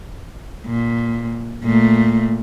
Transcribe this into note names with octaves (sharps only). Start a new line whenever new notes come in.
A#2
A#2 A3